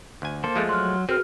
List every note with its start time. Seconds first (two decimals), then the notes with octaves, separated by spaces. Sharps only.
0.22 D2 G#5
0.44 A#3 A4 C5
0.56 F3 G#3 A3
0.69 F#3 C6 F6 F#6
1.09 C4 F#4 G#4 A#4 B4 F6